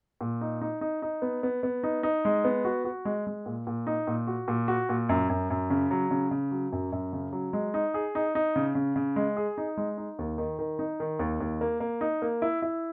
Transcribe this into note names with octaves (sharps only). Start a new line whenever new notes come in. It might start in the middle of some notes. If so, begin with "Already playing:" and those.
A#2
D#4
D#4
D#4
D#4
B3
B3
B3
D#4
D#4
G#3
B3
F#4
F#4
G#3
G#3
A#2
A#2
D#4
A#2
F#4
A#2
F#4
A#2
F#2
F#2
F#2
C#3
F#3
C#3
C#3
F#3
F#2
F#2
C#3
F#3
G#3
D#4
G#4
D#4
D#4
C#3
C#3
C#3
G#3
G#4
D#4
G#3
D#4
D#2
D#3
D#3
D#4
D#3
D#2
D#2
A#3
A#3
D#4
A#3
E4
E4